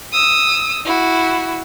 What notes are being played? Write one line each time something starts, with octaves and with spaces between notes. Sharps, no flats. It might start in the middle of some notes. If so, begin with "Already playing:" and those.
D#6 E6
E4 F#4